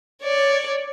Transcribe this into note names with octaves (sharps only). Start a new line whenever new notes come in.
C#5 D5